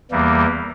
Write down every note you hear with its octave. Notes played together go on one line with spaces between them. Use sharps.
E2 E3 G3 A#3